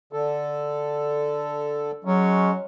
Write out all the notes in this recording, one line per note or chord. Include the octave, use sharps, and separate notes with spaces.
D3 A4
F#3 G#3 C#4